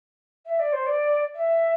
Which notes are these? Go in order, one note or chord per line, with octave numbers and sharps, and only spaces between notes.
E5
D5
C5
D5
E5